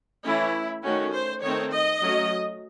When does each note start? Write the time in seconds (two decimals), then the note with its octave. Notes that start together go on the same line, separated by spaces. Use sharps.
0.24 E3 A3 C#4 E4
0.84 D#3 A3 C#4 F#4
1.13 C5
1.43 D#3 A3 C4 C#5
1.72 D#5
2.02 F#3 A3 C#4